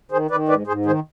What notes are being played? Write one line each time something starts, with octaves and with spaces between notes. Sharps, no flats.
D#3 G#4 C5
D#3 B4 D5
G#2 B4 D5
G#2 G#4 C5
D#3 G#4 C5